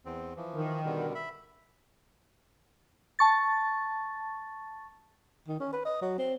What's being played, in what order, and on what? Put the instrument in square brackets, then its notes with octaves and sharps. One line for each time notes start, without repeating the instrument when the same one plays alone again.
[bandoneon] E2 C4
E3 F3
[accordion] D#3
[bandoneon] B2 D3 G3
E5 B5
[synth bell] A5 C#6 A6
[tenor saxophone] D#3
C#4
B4
D#5
F#3
C4